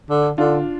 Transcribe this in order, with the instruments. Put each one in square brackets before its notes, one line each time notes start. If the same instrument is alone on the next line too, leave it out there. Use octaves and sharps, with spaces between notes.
[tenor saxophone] D3
[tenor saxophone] D3 [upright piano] D4 F4